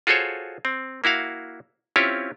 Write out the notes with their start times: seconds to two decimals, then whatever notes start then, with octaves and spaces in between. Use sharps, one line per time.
0.07 F4 F#4 G#4 A4 C5 C#5
0.65 C4
1.04 A#3 E4 F#4 F5
1.96 C4 C#4 E4 F4 G4 C#5